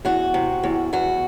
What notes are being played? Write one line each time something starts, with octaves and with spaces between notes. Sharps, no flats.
E2 F#4
C3
E2
E2 F#4